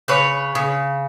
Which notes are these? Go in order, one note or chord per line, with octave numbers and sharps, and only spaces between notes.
C#3 B4 C#5
C#3